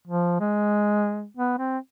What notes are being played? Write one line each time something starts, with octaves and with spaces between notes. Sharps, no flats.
F3
G#3
B3
C4